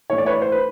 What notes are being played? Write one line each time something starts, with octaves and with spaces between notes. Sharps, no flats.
A2 E3 C#5
D5
B4 C#5
C5
B4